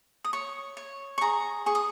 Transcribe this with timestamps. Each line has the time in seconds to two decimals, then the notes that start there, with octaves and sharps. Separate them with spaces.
0.24 D#6
0.33 C#5 C#6
0.77 C#5
1.18 C#6
1.21 G#4 A#5
1.66 G#4 C#6
1.75 D#6